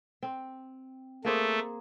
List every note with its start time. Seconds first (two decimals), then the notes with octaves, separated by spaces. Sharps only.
0.23 C4
1.25 A3 A#3 G#4 C5